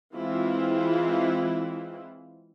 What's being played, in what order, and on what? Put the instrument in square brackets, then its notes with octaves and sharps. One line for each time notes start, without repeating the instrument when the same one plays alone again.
[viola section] E3 G#3 C4 E4 F4